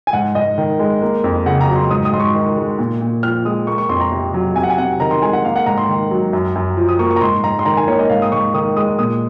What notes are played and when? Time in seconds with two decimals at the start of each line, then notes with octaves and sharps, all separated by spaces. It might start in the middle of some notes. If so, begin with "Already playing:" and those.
0.07 G#5
0.13 G#2 F#5
0.35 G#2 D#5
0.58 D#3
0.79 G#3
1.02 A#3
1.24 F2
1.46 C#3 F#5
1.61 A#5
1.68 F#3
1.76 C6
1.90 G#2 D#6
2.05 D#6
2.13 G#2 C6
2.20 C#6
2.35 D#3
2.57 G#3
2.79 A#2
3.01 A#2
3.23 F3 F6
3.45 G#3 D#6
3.67 A#3 C#6
3.78 C#6
3.89 F2 C6
4.01 A#5
4.12 C3
4.34 F#3
4.56 C3 G#5
4.63 F#5
4.70 G#5
4.78 C3 F#5
5.00 D#3 A#5
5.11 C6
5.22 G#3 G#5
5.33 F#5
5.44 A#3 F5
5.56 F#5
5.66 G#2 A#5
5.78 C6
5.89 D#3
6.11 F#3
6.33 F#2
6.56 F#2
6.77 F3
6.89 D#6
6.99 A#3 C#6
7.11 C#6
7.16 A#5
7.21 G#2 C6
7.43 G#2 A#5
7.59 C6
7.65 D#3 A#5
7.77 G#5
7.87 A#3 C#5
7.99 D#5
8.10 G#2 F5
8.22 D#6
8.32 G#2 C#6
8.54 D#3 D#6
8.76 G#3 D#6
8.99 A#2 D#6